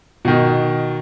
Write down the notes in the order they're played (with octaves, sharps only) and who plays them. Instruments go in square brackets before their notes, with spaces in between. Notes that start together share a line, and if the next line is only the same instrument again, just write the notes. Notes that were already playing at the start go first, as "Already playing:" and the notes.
[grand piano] B2 D#3